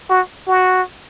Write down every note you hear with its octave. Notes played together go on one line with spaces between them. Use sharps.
F#4
F#4